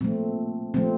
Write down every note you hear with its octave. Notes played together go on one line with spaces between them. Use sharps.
A#2 F3 A3 C4
A#2 F3 A3 C4